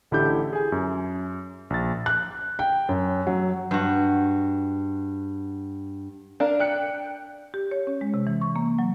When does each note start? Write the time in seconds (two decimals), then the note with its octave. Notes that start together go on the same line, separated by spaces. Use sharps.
0.11 A1 D3 E4 G4 G6
0.53 G#4 G#5
0.72 F#2
1.70 A#1 A6
2.06 F#6
2.59 G5
2.89 F#2
3.27 F#3
3.71 G2 F#4
6.40 D4 A#4 F5
6.59 G5 F#6 C#7
7.54 G4
7.71 C#5
7.87 C#4
8.01 G#3
8.14 C3
8.27 E3
8.41 C#6
8.56 A#3
8.79 F#3